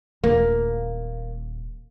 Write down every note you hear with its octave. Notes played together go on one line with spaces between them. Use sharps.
D#1 A#3 D4